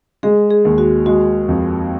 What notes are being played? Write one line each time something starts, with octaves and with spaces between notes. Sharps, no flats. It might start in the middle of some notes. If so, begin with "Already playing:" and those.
G#3 G#4
G#4
D#2
F#4
G#3 F#4
F2